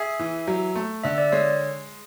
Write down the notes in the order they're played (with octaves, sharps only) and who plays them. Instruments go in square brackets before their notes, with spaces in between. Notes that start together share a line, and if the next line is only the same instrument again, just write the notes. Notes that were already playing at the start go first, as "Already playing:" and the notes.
Already playing: [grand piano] G#4 [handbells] E5
[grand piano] E3
F#3
A3
[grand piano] D3 [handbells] E5
[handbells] D5
[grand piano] G#3 [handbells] C#5